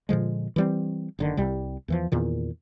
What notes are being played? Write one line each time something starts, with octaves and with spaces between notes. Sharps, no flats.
A#2 D3 F3 G#3
E3 G3 C4
F#1 D3 D#3
C2 C3 G3
E2 E3 F3
E2 A#2 D#3